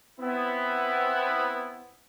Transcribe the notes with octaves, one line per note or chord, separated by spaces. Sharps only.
B3 C4 E4